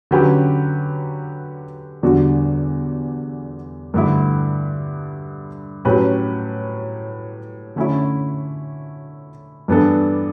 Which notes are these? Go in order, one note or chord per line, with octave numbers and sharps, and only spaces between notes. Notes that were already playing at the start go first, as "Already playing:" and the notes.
D3 F#3 C#4 G4 B4
E2 D3 G3 D4 F#4
G2 D3 A3 E4
A2 F#3 C#4 G4 B4
D3 A3 C#4 E4
G2 E3 B3 D4 A4